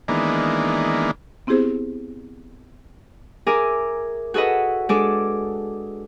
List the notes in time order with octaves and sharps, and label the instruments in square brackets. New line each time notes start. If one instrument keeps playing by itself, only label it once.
[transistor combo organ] D#3 E3 G#3 A#3 B3 D4
[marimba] B3 C4 E4 G4 G#4 C5
[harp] G#4 A#4 E5 G#5 A#5 D6
F#4 G#4 A4 B4 D#5
G#3 D4 G#4 A4 D6